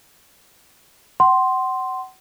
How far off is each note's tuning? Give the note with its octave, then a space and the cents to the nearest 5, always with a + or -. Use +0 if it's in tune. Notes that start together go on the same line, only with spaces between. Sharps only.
F#5 +30 C6 +0